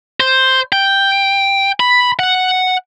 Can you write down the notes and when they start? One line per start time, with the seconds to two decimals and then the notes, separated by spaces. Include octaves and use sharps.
0.20 C5
0.72 G5
1.80 B5
2.19 F#5